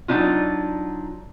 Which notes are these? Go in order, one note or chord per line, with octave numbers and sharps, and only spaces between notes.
F#3 C4 D4 D#4 F4